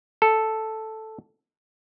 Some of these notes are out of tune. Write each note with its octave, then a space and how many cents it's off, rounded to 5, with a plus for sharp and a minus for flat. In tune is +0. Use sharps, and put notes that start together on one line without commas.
A4 +0